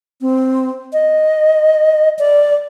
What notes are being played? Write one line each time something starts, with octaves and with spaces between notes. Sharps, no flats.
C4
D#5
D5